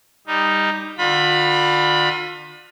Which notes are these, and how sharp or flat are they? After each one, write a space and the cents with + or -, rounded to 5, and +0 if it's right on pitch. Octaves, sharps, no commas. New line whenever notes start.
G3 +15 D#4 +0
D3 +35 F4 +35 B5 +0